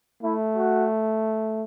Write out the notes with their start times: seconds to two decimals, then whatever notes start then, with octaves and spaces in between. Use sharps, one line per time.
0.23 A3 E4
0.57 F#4